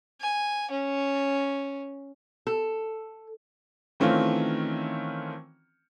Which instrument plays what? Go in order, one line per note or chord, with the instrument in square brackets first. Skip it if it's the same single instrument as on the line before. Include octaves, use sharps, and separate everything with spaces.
[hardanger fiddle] G#5
C#4
[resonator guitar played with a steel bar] A4
[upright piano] D#3 E3 A3 C4 C#4 F4